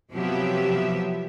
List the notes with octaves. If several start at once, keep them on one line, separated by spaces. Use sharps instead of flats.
C3 F3 F#3 B3 G4 E5